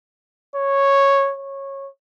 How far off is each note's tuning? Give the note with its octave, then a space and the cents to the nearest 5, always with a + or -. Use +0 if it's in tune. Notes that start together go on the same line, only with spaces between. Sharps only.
C#5 -5
C#5 -15